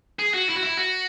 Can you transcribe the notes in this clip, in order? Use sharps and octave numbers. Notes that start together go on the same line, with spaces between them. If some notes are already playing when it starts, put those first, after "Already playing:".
G#4
F#4
E4
F#4
E4
F#4